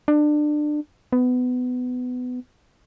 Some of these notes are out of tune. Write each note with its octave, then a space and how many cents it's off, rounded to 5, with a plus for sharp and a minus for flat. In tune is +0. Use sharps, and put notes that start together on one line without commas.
D4 +25
B3 +20